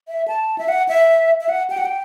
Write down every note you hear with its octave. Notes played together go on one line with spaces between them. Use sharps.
E5
A5
E5
F#5
E5
E5
F#5
G5
F#5
G5